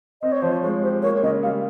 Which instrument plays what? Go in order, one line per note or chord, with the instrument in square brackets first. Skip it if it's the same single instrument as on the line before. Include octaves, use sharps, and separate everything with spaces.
[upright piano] C4 [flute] D#5
[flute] C#5
[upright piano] F3 [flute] C5
[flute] C#5
[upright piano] G#3 [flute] C#5
[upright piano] G4 [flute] C5
[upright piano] A#3 [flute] C#5
[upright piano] C#3 [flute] D#5
[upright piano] G3 [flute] F5